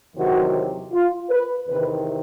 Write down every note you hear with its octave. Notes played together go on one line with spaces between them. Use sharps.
E2 C3 D#3 F#3 F#4
F4
B4
E2 C3 D#3 B4